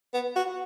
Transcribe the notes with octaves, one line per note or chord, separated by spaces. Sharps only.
B3
F#4